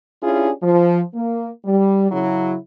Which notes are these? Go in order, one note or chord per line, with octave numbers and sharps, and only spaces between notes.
C#4 D4 E4 F4 G4 G#4
F3
A#3
G3
C#3 F#3 E4